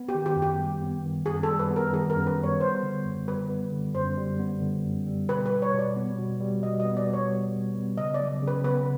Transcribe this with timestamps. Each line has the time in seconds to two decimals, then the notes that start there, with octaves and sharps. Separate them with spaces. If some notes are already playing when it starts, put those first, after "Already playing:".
Already playing: B3
0.09 G4
0.15 D#3
0.26 G4
0.36 F#2
0.42 G4
0.59 G3
0.82 B3
1.04 D#3
1.26 F#2 G#4
1.43 G3 A4
1.59 B4
1.71 B3
1.76 A#4
1.93 D#3 G#4
2.10 A#4
2.16 F#2
2.27 B4
2.38 G3
2.43 C#5
2.60 B3 C5
2.83 D3
3.05 F#2
3.27 G3 B4
3.50 B3
3.72 D3
3.95 F#2 C5
4.17 G3
4.40 B3
4.62 D3
4.84 F#2
5.06 G3
5.29 B2 B4
5.46 B4
5.52 G3
5.62 C#5
5.73 B2
5.79 D5
5.96 B3
6.18 B2
6.41 G3
6.63 B2 D#5
6.80 D#5
6.85 B3
6.97 D5
7.08 B2
7.13 C#5
7.30 G3
7.53 B2
7.74 B3
7.98 C#3 D#5
8.14 D5
8.20 F#3
8.42 C#3
8.48 B4
8.64 B3 B4